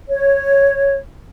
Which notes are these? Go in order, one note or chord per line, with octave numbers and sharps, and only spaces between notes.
C#5